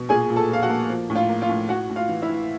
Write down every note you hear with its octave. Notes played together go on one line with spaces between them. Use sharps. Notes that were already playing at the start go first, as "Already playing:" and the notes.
Already playing: B2
A#2 G#4 G#5
A#2
A4 A5
A#2 F5
F#4 F#5
A#3
F3
A2
F4 F5
A#3
F4 F5
A2
A2 F#4 F#5
A2
F4 F5
E3
E4 E5
E3